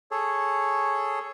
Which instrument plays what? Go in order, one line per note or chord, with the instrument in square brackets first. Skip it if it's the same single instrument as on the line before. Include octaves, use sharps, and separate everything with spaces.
[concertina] G#4 A4 C#5